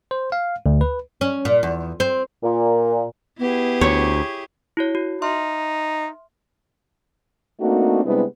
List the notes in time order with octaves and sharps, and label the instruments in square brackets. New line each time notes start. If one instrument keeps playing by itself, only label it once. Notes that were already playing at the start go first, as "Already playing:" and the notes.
[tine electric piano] C5
F5
D2
B4
[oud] C#4
A#2
E2
C4
[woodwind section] A#2
[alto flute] B3 [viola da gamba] E4 G4 G#4
[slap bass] D2 [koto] C#5
[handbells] E4 F#4 C#5
F#4
[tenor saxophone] D#4 [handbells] E5 C6 F6
[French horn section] A3 A#3 C4 D4 D#4 F#4
C3 G3 G#3 B3 D4 E4